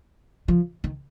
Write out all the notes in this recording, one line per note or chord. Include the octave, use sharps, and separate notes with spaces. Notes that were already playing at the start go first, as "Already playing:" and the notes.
F3
D#3